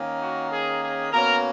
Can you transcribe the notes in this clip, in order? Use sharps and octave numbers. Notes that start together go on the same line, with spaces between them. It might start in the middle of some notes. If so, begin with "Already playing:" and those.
Already playing: D#3 A#3 C#4
F#4
G#4
G#4
B2 A#3 C#4 A#4